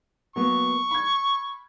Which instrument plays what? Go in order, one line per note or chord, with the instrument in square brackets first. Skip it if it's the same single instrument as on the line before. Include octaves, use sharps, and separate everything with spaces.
[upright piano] F#3 A#3 B3 [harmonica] C#6
[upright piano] B5 G#6